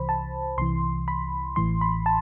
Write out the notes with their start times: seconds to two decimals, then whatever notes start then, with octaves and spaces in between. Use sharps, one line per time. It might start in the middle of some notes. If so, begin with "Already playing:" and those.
Already playing: C2 C3 E3 C5 B5
0.09 A5
0.58 C2 C3 E3 C6
1.08 B5
1.56 A1 A2 E3 C6
1.81 B5
2.06 A5